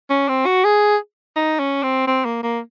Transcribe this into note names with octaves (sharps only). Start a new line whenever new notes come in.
C#4
C4
F#4
G#4
D#4
C#4
C4
C4
A#3
A#3